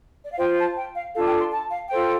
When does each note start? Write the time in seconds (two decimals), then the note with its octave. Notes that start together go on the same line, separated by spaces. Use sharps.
0.24 D5
0.32 F5
0.38 F4 C5 G5
0.58 A5
0.77 G5
0.95 F5
1.14 D4 F4 A4 F5
1.26 G5
1.39 C6
1.51 A5
1.71 F5
1.89 F4 A4 C5 G5